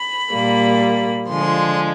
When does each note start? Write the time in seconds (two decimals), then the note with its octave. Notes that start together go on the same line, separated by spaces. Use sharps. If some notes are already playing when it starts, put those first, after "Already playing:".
Already playing: B5
0.32 A#2 G3 A#3
1.28 D3 F3 G#3 C6